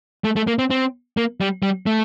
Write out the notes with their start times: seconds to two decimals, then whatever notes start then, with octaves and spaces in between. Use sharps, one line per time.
0.24 A3
0.36 A3
0.47 A#3
0.59 C4
0.70 C4
1.17 A#3
1.41 G3
1.63 G3
1.86 A3